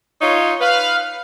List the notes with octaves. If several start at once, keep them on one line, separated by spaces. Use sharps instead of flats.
D#4 F4 C#5
B4 F5